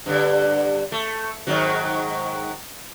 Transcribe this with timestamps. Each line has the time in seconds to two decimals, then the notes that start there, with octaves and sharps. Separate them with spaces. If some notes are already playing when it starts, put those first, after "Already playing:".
0.06 G2 D3
0.92 A3
1.47 G#2 D#3 F#3